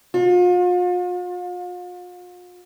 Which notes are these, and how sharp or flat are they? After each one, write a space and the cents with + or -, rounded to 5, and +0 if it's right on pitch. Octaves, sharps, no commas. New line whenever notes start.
F4 +40